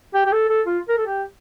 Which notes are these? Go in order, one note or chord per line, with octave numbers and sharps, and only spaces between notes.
G4
G4
A4
A4
F4
A#4
A4
G4